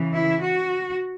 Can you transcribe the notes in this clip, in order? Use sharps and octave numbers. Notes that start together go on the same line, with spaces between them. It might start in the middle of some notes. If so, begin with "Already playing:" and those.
Already playing: C#3 E3
E4
F#4